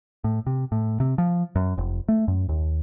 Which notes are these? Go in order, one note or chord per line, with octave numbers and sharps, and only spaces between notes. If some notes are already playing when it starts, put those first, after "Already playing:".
A2
C3
A2
C3
F3
F#2
F1
A3
F#2
D#2